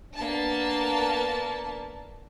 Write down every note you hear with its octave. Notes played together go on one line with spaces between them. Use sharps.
A#3 B3 D4 A5